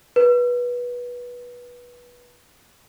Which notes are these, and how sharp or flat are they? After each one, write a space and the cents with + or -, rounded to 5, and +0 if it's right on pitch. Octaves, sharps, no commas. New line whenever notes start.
B4 -20